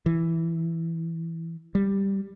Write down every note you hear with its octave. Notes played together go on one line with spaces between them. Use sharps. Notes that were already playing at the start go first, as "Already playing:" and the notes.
E3
G3